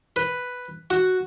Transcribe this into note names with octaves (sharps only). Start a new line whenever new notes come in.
B4
F#4